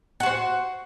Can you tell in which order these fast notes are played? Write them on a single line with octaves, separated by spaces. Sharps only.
F#5 F#4 C5